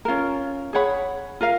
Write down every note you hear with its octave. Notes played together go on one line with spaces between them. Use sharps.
C#4 F4 A#4
G#4 C#5 F#5 B5
F4 A#4 F5